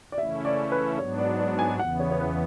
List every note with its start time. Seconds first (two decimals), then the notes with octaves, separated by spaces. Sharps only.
0.12 D5
0.18 C#3 E3 A3 C#4 E4 E5
0.45 D5
0.72 B4
0.98 G#2 F#3 B3 D4 C#5
1.18 D5
1.39 D5
1.59 G#5
1.79 E2 C#3 E3 B3 F#5
2.00 C#5
2.11 C#5
2.20 B4